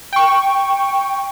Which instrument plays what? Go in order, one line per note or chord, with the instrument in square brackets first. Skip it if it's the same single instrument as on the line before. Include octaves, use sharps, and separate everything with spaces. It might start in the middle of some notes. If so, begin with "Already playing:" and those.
[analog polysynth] G5 C#6